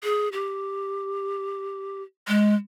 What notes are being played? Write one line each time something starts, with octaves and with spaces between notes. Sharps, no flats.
G#4
G4
G#3